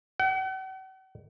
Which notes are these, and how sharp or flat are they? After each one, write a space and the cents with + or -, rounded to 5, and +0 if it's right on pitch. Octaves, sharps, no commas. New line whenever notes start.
F#5 +45